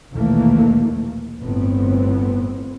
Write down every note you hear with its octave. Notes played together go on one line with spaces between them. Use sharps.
A#1 D#2 B2 E3 A3 A#3
G1 A2 B3 C4